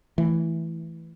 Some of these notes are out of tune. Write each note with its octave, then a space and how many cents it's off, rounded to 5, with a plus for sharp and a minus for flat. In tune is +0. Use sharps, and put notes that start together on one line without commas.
E3 +0 A3 +0